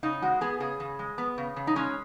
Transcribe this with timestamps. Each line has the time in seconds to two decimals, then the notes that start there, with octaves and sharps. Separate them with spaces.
0.03 C#3 D#4
0.22 G#3 F#4
0.41 B3 G#4
0.60 C#3 G#4
0.80 C#3
0.99 G#3
1.18 B3
1.38 C#3
1.56 C#3
1.67 D#4
1.76 G#3 C#4